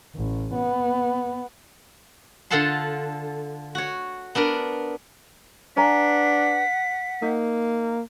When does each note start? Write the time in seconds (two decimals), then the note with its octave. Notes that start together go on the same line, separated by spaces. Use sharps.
0.15 A1
0.55 B3
2.50 D3 F4 A4 F#5 A5 C6
3.75 F#4 C#5
4.35 B3 D4 A#4 B4
5.77 D4 B4 F#5 G#5 A#5 B6
7.22 A#3 D#4